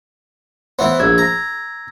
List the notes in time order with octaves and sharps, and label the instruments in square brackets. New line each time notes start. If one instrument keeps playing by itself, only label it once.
[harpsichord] E3 B3 [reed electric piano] C5 C#5 E5
[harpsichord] A#1 [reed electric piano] E6 G#6
[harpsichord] A#5